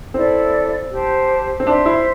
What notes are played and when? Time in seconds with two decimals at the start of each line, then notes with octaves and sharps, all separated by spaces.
0.14 C4 E4 A4 D5
0.90 G4 C5 A5
1.60 C4
1.67 D4 C5 E5 C6
1.86 E4